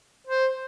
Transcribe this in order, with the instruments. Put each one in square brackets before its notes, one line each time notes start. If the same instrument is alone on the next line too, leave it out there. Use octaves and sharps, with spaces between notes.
[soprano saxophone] C5